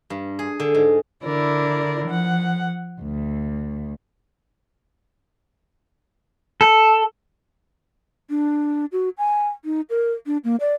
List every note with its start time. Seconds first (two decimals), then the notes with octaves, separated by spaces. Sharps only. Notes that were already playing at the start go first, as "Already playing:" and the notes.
0.10 G2
0.39 G#4
0.60 D3
0.74 G#2
1.25 D3 D4 E4 A#4 D5
2.06 F3 F#5
3.00 D2
6.61 A4
8.30 D4
8.92 F#4
9.18 G#5
9.65 D#4
9.90 A#4
10.26 D4
10.44 A#3
10.60 D5